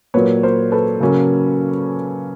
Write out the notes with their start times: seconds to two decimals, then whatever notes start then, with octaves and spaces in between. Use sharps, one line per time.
0.14 A#2 F#3 A#3 B4 C#5
0.43 A#4 C5
0.72 A4 B4
1.00 C#3 F#3 A#3 C#4